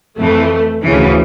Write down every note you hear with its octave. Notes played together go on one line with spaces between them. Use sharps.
F2 E3 A3
D2 C#3 E3